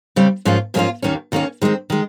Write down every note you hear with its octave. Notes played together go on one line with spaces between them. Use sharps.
C#3 G3 C4
G#2 F3 A#3 C#4 F4
G#2 F3 A#3 C#4 F4
D#2 D#3 A#3 C#4
D#2 D#3 A#3 C#4
D#3 G#3 C4
D#3 G#3